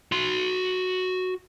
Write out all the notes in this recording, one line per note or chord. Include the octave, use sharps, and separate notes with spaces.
F#4 C6